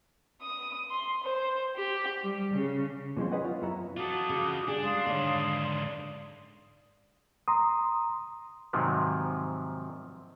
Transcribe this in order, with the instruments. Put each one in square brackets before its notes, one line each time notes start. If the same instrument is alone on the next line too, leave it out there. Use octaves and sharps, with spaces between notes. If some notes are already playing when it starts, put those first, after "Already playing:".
[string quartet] D#6
C6
C5
G4
G3
C#3
[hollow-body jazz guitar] A#2 E3 F#3 G#3 A#3 C4
C#4 G#4 B4 D#5 F#5
F4
F#2 B3 E4 C#5 A#5
[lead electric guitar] F4 A4 [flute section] F#4 D6 D#6
[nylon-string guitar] C#3
[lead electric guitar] D4 [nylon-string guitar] G4 G#4
[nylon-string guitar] G#3 [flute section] F5 C6 D#6
[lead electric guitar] G#2 D4 [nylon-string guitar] D3 D#3 C#5
[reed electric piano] A#5 C6 D#6
[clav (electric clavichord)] G#2 C3 D#3 F3 F#3